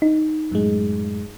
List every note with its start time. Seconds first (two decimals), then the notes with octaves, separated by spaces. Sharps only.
0.02 D#4
0.52 F#2 A2 G#3